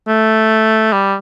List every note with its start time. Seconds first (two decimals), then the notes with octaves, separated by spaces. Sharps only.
0.07 A3
0.93 G3